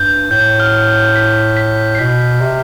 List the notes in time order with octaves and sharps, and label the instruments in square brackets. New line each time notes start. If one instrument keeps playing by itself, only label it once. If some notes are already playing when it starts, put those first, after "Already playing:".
Already playing: [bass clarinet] G2 [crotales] G6
[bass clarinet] A2 [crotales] G6
[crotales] F6
B6
B6
C7
[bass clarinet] B2 [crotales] B6
[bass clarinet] C3